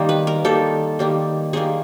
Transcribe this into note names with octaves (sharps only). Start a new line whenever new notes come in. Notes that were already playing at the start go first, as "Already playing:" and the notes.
Already playing: D#3 G3 A#3
B4
A#4
D#3 G3 A#3 A4
D#3 G3 A#3
D#3 G3 A#3 G#4